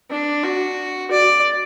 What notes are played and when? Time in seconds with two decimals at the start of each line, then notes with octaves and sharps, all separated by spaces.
0.10 D4
0.43 F#4
1.11 D5